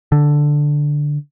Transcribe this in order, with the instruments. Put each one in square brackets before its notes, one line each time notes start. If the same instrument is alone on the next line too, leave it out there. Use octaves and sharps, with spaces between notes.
[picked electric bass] D3